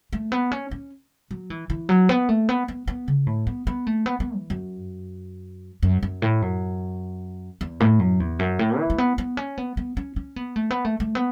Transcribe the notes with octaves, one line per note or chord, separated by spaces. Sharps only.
A3
B3
C#4
C#4
F#3
E3
E3
F#3
B3
A3
B3
B3
B3
C#3
A2
B3
B3
A3
B3
B3
E3
F#2
F#2
F#2
A2
F#2
E2
A2
F#2
E2
F#2
A2
E3
A3
B3
B3
C#4
B3
B3
C#4
C#4
B3
A3
B3
A3
A3
B3